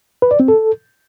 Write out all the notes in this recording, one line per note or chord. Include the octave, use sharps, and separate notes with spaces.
B4
D5
C4
A4